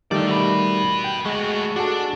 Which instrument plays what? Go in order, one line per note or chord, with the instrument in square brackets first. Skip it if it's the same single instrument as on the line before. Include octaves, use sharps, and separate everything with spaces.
[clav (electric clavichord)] D#3 G3 A3 [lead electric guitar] A4 D5
[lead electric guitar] F#4 B4
[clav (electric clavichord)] G5
[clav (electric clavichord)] G#3 [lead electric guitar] A3 F#4
[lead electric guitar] D4 [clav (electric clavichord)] F#4 G#4 A4